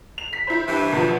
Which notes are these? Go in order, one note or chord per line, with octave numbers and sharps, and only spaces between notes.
F7
B6
E4 C5
G2 E3
G#1 B2 F3